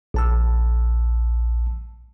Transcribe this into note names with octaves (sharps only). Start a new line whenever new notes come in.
A#1 A5 E6